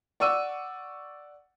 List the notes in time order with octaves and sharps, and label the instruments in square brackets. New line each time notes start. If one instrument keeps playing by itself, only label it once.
[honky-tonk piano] D5 F#5 C#6 E6 D#7